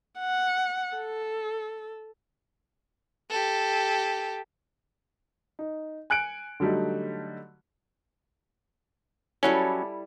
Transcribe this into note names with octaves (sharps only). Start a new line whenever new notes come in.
F#5
A4
G4 A4
D#4
G#5 F#6 C#7 D7
D3 F#3 G3 A3 D#4
F#3 G3 C#4 E4 A4